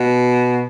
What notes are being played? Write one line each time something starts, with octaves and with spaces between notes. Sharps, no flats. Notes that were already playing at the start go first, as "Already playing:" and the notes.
Already playing: B2